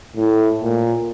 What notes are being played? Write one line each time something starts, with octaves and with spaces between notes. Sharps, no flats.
A2
A#2